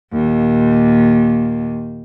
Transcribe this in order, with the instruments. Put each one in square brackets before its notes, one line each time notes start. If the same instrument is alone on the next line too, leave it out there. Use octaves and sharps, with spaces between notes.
[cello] D#2 A#2